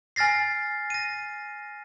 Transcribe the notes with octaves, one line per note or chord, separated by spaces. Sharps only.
G#5 F6 A6 A#6 C7
A#6 D#7